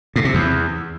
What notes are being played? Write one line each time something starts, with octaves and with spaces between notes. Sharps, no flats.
A2
C3
E2